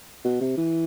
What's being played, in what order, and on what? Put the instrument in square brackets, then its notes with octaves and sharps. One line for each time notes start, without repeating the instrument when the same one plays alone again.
[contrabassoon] B2
C3
E3